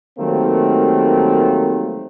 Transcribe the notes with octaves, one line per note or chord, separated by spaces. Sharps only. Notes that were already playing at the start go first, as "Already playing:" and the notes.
D#3 F#3 G3 A3 A#3 C4